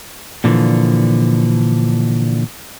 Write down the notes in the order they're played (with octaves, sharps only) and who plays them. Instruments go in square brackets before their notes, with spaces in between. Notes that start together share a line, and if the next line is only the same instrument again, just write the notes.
[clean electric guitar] A#2 D3 E3 F3